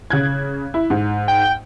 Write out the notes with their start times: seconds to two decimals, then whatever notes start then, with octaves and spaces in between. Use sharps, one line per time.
0.10 C#3 F#6 G#6
0.74 E4
0.90 G#2
1.28 G5